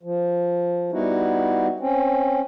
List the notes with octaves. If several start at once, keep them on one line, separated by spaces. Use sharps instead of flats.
F3
G3 B3 D#4 E4 F#4
C4 C#4